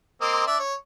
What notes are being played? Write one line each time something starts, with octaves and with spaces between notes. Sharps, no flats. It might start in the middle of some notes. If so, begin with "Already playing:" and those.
A#3 C4 D#5
D4 D5 E5
C#5